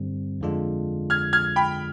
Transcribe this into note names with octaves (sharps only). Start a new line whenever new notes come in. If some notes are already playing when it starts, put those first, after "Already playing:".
Already playing: G2 D3 G3 C4
F2 D3 G#3 D4 F4
F6 G#6
F6 G#6
G5 B5